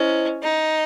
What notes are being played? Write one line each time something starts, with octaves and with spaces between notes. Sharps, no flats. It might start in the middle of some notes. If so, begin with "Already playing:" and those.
Already playing: C#4 E4 C5 D#5
D#4